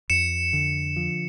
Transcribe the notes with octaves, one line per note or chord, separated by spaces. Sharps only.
F2 C#7 E7
D3
F3